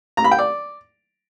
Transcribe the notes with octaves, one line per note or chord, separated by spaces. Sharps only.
A#5
B5
G5
D5